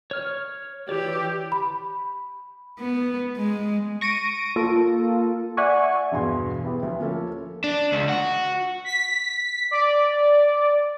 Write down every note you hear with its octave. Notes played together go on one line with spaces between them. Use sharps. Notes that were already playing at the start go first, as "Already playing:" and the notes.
C#5 F6
E3 G4 C#5 D5
B5
B3
G#3
C#6 A#6 D7 D#7
A#3 F4 A4
D5 E5 F#5 G#5 C#6
E2 G2 B2 G#4 C6
B3 E4 G4 G#4
D2
F3 A#3 C#4 A4
D4
C#2
F#4
B6
D5